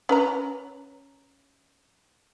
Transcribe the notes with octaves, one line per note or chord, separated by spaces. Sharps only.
C#4 B4 A#5